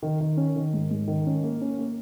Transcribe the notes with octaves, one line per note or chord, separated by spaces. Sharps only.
D#3
D#3
C#4
D#3
G#2
G#2
D#3
C#4
A#3
C#4
A#3